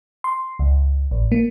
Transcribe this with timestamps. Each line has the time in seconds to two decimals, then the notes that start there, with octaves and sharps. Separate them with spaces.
0.24 C6
0.59 C#2
1.11 A1
1.32 A#3